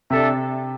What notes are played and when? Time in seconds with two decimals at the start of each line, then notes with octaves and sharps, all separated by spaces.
0.10 C3 D4 A4 E5